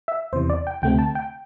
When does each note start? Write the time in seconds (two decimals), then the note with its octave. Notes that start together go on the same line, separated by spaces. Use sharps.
0.08 E5
0.33 E2 C3 E3 C5
0.50 D5
0.67 G5
0.82 D2 C3 A3 C4 G5
0.99 A5
1.15 G5